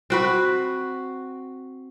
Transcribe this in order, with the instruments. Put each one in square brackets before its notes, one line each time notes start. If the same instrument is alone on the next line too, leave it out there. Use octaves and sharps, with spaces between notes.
[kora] C4 F#4 B4